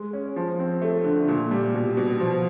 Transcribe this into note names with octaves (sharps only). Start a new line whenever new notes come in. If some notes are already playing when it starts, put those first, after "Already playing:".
Already playing: G#3
C#4
F3
C4
A3
D3
A#2
G3
B2
B2
F3